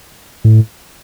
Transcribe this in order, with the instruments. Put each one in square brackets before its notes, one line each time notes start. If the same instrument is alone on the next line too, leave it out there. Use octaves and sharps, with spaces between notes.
[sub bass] A2